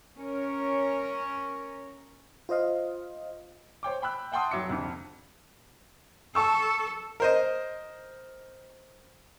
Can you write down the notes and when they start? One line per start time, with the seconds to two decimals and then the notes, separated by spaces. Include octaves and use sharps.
0.17 C#4 A#4 C#5
2.49 F4 C5 D#5 F5
3.83 C5 C#5 G5 D6
4.02 G5 B5 E6 F#6
4.32 E5 F#5 G5 A5 C6 D#6
4.51 F1 F#3 E5 D6 C#7
4.70 C2 F2 D3
6.35 A4 A5 C#6 E6
7.20 A#4 C5 D#5